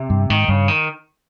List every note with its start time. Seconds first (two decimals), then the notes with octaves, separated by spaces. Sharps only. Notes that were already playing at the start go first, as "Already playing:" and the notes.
Already playing: C3
0.10 G2
0.30 G#2 D#3
0.48 G2 C#3
0.68 D#3